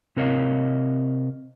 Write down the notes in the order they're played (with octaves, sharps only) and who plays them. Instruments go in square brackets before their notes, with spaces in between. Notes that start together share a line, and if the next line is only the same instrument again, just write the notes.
[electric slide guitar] C3 C4 A#4 C#5 D#5 F5